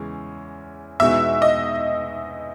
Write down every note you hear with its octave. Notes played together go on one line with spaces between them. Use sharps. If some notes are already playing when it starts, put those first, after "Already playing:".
Already playing: E2 C#3 E3 G#3 C#4
E2 B2 G#3 D#4 F#4 E5
D#5